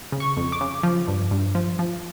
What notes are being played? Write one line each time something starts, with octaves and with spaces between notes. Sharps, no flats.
C#3
C#6
F2
D6
C#3
F3
G2
G2
F3
F3